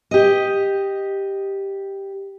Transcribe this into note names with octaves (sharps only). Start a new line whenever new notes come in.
G4 D#5